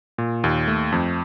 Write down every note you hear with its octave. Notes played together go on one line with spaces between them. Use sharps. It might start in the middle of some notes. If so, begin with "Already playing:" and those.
A#2
D#2
A3
F2